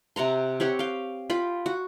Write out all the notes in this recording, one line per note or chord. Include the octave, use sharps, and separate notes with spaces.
C3 F#5 A#5 C6
C4 G4 C#5 F#5
F5 G5
F4 G5 B5
F#4